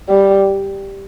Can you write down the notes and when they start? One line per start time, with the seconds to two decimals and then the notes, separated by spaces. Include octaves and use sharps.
0.09 G3